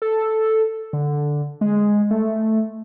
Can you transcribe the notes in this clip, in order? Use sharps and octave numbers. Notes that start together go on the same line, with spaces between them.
A4
D3
G#3
A3